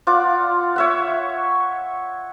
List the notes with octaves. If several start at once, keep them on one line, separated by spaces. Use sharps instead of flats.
F4 D5 F#5 D6
C#5 E5 F#5